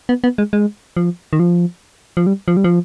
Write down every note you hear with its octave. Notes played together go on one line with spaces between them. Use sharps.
B3
B3
G#3
G#3
F3
D#3
F3
F3
G3
F3
G3
F3